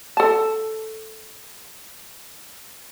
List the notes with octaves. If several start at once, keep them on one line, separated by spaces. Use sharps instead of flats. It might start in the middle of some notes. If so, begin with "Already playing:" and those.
A4 A5